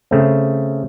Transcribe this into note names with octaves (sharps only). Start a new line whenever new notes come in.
C#3 A3 C4